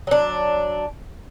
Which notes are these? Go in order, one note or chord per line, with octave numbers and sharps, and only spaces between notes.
F#3 D4